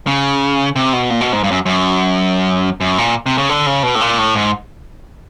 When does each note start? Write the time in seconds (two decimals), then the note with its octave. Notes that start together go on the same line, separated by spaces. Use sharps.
0.07 C#3
0.76 C3
0.93 B2
1.10 A#2
1.21 B2
1.33 G#2
1.44 G2
1.51 F#2
1.66 F#2
2.81 F#2
2.98 A#2
3.26 C3
3.38 C#3
3.49 D3
3.66 C#3
3.83 B2
3.95 A2
4.01 A#2
4.18 A2
4.35 G#2